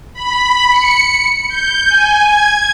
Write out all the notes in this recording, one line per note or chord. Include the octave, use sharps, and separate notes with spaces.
B5
C#7
G6
G#5
G#6